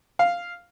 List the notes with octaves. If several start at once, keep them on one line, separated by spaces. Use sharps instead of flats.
F5